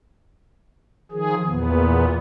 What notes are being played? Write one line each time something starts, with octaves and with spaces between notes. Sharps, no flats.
D#3 F3 G#4
E2 A#2 B3